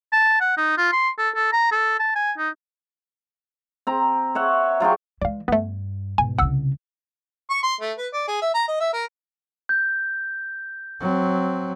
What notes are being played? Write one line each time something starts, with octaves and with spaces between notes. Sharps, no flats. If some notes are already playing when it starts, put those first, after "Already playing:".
A5
F#5
D#4
F4
C6
A4
A4
A#5
A4
A5
G#5
D#4
C4 A#5
C#5 E5 F#5
F#3 F4 G#4 G5
E3 G#3 D5 F5
G2 A3 B3
G#2 B2 G#5
C2 C#3 F#5 E6
C#6
C6
A3
B4
D5
G#4
E5
A#5
D#5
E5
A#4
G6
F#3 C4